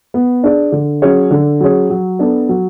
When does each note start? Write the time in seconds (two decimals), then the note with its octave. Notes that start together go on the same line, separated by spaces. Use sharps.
0.14 B3
0.44 D4 G#4 D5
0.72 D3
1.02 F#3 C#4 G#4 C#5
1.31 D3
1.60 F#3 C#4 G#4 C#5
1.90 F#3
2.19 B3 D4 A4
2.49 F#3